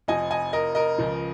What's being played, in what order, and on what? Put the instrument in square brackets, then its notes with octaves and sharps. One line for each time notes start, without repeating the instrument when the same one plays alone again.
[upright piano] F1 F2 F3 D#5 G#5
D#5 G#5
A#4 D#5
A#4 D#5
C#2 C#3 F3